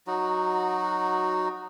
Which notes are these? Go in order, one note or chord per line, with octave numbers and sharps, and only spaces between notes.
F#3 D#4 F#4